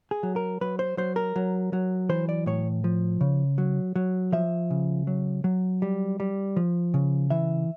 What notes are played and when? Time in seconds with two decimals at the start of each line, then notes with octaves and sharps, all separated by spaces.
0.11 G#4
0.23 F#3
0.36 A#4
0.61 F#3 B4
0.79 C5
0.97 F#3 C5
1.16 A#4
1.36 F#3
1.73 F#3
2.09 E3 C5
2.29 D5
2.46 A2 C#5
2.84 F3
3.21 C#3
3.58 F#3
3.96 F#3
4.32 F3 E5
4.70 C#3
5.07 F#3
5.44 F#3
5.82 G3
6.20 G3
6.56 F3
6.94 C#3
7.30 E3 E5